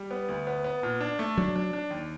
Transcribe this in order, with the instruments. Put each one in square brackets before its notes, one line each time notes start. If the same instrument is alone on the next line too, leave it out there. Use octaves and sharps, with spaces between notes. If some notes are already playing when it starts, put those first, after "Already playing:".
Already playing: [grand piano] G3
B3
D2
B3
B3
A#2
D4
A3
[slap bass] F#3 [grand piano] D4
[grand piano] D4
D4
D#2